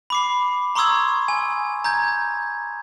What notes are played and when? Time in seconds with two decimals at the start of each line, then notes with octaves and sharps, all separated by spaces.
0.10 B5 D6 C7
0.75 A#5 C6 C#6 D#6 E6 G#6
1.28 G#5
1.84 A#5 G6 G#6